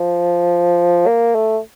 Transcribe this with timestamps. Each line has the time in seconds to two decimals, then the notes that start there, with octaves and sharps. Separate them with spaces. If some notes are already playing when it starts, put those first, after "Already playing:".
Already playing: F3
1.07 A#3
1.35 A3